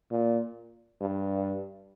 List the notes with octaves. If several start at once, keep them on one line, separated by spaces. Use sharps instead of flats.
A#2
G2